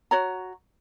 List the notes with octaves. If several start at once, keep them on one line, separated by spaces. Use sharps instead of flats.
F#4 C#5 A#5